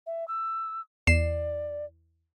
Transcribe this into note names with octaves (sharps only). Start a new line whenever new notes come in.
E5
E6
E2 D5 C7 E7